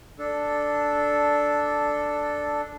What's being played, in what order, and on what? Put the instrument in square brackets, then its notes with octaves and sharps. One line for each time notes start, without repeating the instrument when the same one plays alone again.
[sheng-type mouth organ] D4 A4